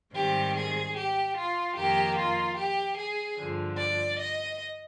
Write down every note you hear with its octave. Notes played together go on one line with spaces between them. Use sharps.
G#2 D#3 G3 C4 G4
G#4
G4
F4
F2 D#3 A#3 G4
F4
G4
G#4
G2 D3 F3
D5
D#5